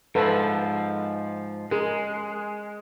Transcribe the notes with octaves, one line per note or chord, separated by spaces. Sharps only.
G#2 F3 A4 B4 B5
G#3 G#4 A#4